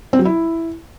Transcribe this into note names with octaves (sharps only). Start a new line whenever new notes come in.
C4
F#3
E4